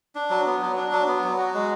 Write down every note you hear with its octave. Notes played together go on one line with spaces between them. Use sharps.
D4
F#3
B3
F#3
D4
F#3
B3
F#3
F#4
G#3